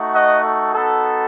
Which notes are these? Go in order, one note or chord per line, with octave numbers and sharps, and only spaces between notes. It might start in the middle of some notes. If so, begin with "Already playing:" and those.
Already playing: A3 D#4 F#4
D#5 F#5
A4
B3 D#4 F#4 A4